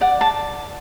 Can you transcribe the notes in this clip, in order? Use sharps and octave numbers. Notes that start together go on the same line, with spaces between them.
D5 F#5
A5